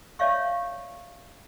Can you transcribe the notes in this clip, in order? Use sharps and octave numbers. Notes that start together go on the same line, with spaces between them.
C#5 D5 E5 F5 C#6